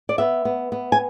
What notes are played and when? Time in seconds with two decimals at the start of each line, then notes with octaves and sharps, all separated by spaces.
0.09 D5
0.18 B3 E5
0.45 B3
0.72 B3
0.92 G#5